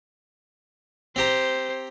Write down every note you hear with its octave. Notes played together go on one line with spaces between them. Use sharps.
C4 G4 C5 A#5